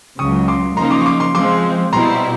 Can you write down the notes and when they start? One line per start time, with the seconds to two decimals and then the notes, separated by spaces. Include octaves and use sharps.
0.19 C#2 C#3 F#3 C#6 D#6
0.48 C6 D6
0.77 C#3 F3 A#3 D#4 A#5 C6
0.91 C6 D6
1.01 C#6
1.06 C6 D6
1.20 C6 D6
1.35 F3 G#3 C4 C6 D6
1.93 B2 G3 C4 E4 A#5 C6